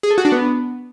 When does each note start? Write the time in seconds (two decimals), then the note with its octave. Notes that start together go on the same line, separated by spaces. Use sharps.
0.03 G#4
0.10 A4
0.18 F#4
0.25 D4
0.32 B3